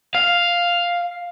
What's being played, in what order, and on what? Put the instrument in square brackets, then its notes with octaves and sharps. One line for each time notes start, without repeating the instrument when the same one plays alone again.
[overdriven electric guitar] F5